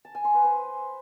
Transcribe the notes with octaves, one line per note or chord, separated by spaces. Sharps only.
A5
G#5
C6
B4
C5